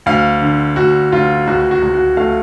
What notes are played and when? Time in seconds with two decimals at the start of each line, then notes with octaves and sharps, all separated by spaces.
0.06 D2 F5
0.41 D3
0.76 D2 F#4
1.12 D2 F4
1.47 C#2 F#4
1.71 F#4
1.82 C#2
1.94 F#4
2.17 A3 F5